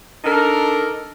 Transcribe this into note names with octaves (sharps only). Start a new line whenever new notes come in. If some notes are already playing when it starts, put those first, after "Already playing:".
D4 D#4 A4 A#4